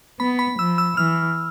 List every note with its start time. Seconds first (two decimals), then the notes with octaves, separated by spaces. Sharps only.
0.20 B3 B5
0.39 B5
0.59 F3 E6
0.78 E6
0.97 E3 F6